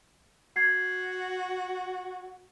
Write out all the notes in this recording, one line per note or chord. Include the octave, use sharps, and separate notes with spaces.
F#4 G#6 C7